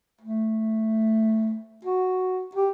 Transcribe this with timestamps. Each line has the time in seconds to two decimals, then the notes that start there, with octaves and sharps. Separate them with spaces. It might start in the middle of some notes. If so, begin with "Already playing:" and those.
0.21 A3
1.85 F#4
2.55 G4